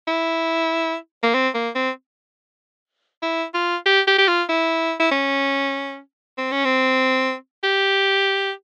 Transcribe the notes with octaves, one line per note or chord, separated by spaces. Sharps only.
E4
A#3
C4
A#3
C4
E4
F4
G4
G4
G4
F4
E4
E4
C#4
C4
C#4
C4
G4